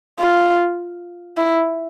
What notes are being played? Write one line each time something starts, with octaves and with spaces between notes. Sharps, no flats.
F4
E4